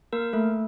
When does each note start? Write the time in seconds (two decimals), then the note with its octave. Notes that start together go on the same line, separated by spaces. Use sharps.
0.13 A#3 A#4
0.33 A3 A4